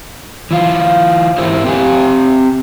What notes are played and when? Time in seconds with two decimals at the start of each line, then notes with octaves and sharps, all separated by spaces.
0.51 E3 F4
1.38 G#2 E4 A#4 C5
1.65 C4 G4 G#5